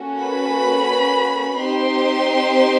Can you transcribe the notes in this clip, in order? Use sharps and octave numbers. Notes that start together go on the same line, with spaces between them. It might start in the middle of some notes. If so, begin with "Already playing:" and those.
Already playing: A#3 C#4 F#4 A4
B4 B5
C4 D#4 G4 C5 C6